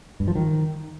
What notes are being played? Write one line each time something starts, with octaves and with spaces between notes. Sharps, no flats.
G2
F3
D#3